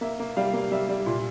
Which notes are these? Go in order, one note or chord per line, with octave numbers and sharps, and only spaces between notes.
A#3 E5
A#3
G3 F5
A#3
G3 E5
G3
A#2